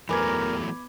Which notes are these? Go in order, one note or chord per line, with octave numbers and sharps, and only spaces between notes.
E2 E3 F#3 A3 A#4 B5 D6 G#6